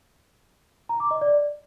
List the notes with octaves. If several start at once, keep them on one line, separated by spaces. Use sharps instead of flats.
A#5
D6
D#5
D5